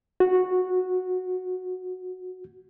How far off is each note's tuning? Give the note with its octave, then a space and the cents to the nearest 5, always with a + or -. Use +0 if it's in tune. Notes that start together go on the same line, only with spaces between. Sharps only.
F#4 -10